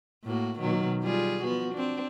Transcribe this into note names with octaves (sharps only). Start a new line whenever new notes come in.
A2 A#3 F#4
B2 D#3 F#3
G3 F4 G#4
F3 B3 F#4
C4 D4